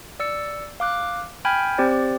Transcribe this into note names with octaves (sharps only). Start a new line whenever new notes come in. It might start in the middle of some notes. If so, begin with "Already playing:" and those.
D5 E6 C#7
F5 D6 F#6
G5 G#5 B5 F6 G6 G#6
C4 G4 C5 D5